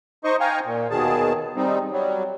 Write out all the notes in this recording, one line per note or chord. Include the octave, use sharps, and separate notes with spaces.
D#4 C5 D#5 C#6
F5 G5 G#5 A#5 C#6
A#2
D#2 B2 D#3 G#4 A5
G3 C4 D#4
F#3 G3